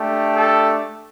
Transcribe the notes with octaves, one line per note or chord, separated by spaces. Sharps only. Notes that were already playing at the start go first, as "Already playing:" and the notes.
Already playing: A3 D4 G4
A4